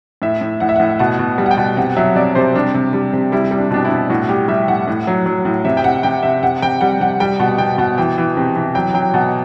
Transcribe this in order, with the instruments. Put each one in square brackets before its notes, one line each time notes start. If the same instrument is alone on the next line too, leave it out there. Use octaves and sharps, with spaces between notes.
[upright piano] A2 E5
A2
A2 F#5
E5
A2 F#5
B2 F#5
B2
G3
F#5
G5
B2
C3 F#5
F#3 E5
C3 D5
C3 C5
G3 D4
C3
G3
C3
G3 E4
G3
D4
B2 D4
E4
B2
A2 F#4
G3 G4
G3 E5
A2 F#5
A2
F#3
F#3
A2
C3 E5
G5
C3 F#5
C3 G5
C3 E5
C3 F#5
C3 G5
G3 F#5
C3 F#5
G3 G5
B2 F#5
B2 G5
B2 F#5
E3 G5
E3
C3
E3
F#3 G5
F#3 G5
B2 F#5